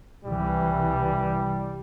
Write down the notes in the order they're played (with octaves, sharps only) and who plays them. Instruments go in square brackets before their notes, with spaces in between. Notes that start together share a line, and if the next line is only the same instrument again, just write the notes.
[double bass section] C2 E3 [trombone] G3